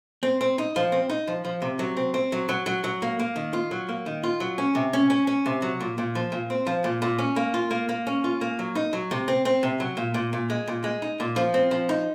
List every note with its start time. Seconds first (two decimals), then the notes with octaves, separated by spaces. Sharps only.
0.23 C4
0.41 C4
0.58 D#4
0.76 F3
0.92 C4
1.09 D#4
1.27 F3
1.45 F3
1.62 C3
1.79 F#3
1.97 C4
2.14 C4
2.32 F#3
2.49 F#3
2.66 F#3
2.84 F#3
3.02 A#3
3.19 A#3
3.36 D#3
3.53 F4
3.71 F#3
3.89 A#3
4.06 D#3
4.23 F4
4.40 F#3
4.58 C#4
4.75 C3
4.93 C#4
5.10 C#4
5.27 C#4
5.46 C3
5.62 F#3
5.80 A#2
5.98 A#2
6.15 F3
6.32 A#2
6.50 C4
6.67 F3
6.84 A#2
7.02 A#2
7.18 C#4
7.36 A#3
7.54 F4
7.71 A#3
7.89 A#3
8.07 C#4
8.24 F4
8.41 A#3
8.59 F#3
8.75 D#4
8.93 F#3
9.11 C3
9.28 C4
9.45 C4
9.63 C3
9.80 F#3
9.97 A#2
10.14 A#2
10.33 A#2
10.50 G#3
10.68 A#2
10.84 G#3
11.02 D#4
11.20 A#2
11.36 F3
11.54 C4
11.71 F3
11.89 D#4